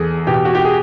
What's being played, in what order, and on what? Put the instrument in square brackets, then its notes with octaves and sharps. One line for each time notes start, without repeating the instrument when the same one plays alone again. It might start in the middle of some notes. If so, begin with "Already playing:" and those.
Already playing: [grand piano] E2 G#4 A4
B2 G4
F#4
G4
G#4